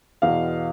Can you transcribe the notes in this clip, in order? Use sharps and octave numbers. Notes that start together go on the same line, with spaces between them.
E2 B2 F5